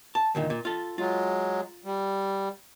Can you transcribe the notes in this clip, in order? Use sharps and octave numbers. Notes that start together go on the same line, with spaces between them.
A5
D2 A#2 D#3
A#2
F4 A4
F#3 G#3 F4
G3